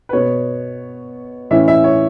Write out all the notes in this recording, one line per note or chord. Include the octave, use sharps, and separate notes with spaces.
B4
B2 B3 C#5
A2 E3 C#4 E5
E5
C#5